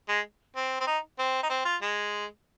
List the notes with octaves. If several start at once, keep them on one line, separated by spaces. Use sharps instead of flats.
G#3
C4
C4
D#4
C4
D#4
C4
F4
G#3